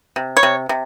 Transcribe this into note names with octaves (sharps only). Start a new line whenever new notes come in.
C3
C#5
C3
C3